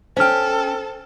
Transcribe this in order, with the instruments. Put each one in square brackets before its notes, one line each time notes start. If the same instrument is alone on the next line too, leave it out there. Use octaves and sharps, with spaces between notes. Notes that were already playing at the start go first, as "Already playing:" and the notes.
[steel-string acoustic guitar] C#4 G5 [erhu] A4 [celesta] C5 F6